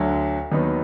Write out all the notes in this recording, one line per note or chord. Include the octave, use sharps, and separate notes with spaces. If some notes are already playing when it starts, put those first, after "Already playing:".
Already playing: D2 D3 F#3
D#2 D#3 F#3 B3 D#4